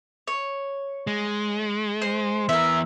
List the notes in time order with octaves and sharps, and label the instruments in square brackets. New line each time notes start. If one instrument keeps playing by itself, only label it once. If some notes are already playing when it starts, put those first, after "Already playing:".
[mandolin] C#5
[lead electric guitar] G#3
[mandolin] C5
[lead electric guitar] E3 B3 [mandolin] A#4 E5